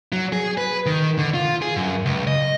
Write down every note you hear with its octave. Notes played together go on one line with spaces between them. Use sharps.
F#3
G#4
B4
D#3
D3
F4
G#4
F#2
C#2
D#5